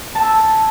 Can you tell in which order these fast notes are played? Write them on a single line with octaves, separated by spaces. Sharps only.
A5 G#5 E6